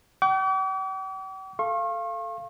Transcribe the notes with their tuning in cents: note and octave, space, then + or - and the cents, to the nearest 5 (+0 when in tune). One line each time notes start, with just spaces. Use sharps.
G5 -45 D6 -40
A4 -5 F5 -20 C#6 -40